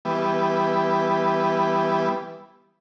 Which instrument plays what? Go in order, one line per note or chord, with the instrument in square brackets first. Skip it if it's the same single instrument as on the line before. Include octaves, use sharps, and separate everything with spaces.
[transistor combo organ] E3 G3 B3